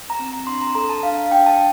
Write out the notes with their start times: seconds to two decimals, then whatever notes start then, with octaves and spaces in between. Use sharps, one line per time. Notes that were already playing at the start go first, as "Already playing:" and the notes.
0.10 A#5
0.19 C4
0.28 A#5
0.47 D4 C6
0.61 A#5
0.75 A4 A#5
0.89 A5
1.03 D4 F5
1.18 F5
1.31 D4 G5
1.46 A5